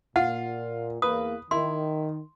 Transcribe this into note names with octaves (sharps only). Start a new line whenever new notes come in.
A#2 F4 F#5
E2 A#3 B4 D#6
D#3 E4 C6